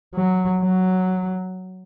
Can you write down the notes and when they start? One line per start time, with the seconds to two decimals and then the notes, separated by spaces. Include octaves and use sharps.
0.15 F#3
0.62 F#3